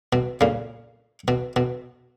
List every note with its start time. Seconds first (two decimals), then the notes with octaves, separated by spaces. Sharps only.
0.13 B2
0.41 A#2 C#3
1.28 B2
1.56 B2